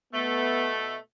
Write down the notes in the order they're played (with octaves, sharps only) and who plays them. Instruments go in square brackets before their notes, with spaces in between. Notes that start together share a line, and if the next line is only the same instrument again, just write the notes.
[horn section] B2 A3 [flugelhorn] B3